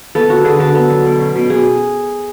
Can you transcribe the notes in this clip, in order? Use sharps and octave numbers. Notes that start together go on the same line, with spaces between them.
B3 A4
D3 F#4
D3 G#4
D3 A4
B3
F#3
B2
C#4
B2
B2 G#4